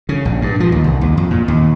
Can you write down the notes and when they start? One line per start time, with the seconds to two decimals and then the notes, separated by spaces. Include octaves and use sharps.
0.09 C#3
0.25 A#1
0.42 G2
0.60 F3
0.72 D#2
0.84 C2
1.01 D#2
1.17 F2
1.31 A#2
1.48 D#2